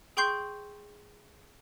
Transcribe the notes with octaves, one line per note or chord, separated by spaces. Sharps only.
G#4 G5 C6 C#6 G6 C7